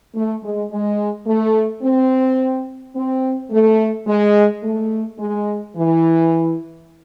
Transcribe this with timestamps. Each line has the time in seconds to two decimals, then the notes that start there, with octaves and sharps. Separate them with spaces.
0.14 A3
0.43 G#3
0.70 G#3
1.27 A3
1.83 C4
2.95 C4
3.51 A3
4.07 G#3
4.63 A3
5.19 G#3
5.76 E3